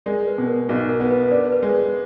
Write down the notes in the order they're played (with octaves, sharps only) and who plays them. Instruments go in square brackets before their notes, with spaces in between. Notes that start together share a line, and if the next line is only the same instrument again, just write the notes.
[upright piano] G#3 [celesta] A#4 D5
[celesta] B4
[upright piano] B2
[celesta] A#4
[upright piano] B1 [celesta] F#4
[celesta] A#4
[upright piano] B3
[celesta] B4
[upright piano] D4 [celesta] A#4 D5
[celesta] B4
[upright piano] G#3